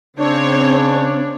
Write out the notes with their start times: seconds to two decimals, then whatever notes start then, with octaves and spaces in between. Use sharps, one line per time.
0.17 C#3 C4 D4 C#5